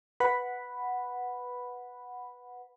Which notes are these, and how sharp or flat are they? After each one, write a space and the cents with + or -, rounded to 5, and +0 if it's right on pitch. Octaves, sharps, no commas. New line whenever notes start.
B4 +0 F#5 -5 B5 +0